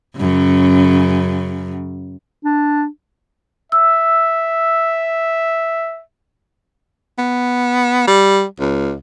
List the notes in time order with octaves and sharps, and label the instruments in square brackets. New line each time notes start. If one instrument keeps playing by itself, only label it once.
[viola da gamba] F#2 C#3
[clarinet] D4
[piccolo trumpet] E5 [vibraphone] E6
[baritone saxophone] B3
G3
C#2